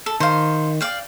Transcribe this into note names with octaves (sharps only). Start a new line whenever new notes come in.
A4
D#3 C5 F5
D5 F5 G5